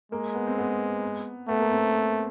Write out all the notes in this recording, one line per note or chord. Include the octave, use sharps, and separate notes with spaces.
G#3 A#3
B3
C4
B3
A3 B3
A#3
C4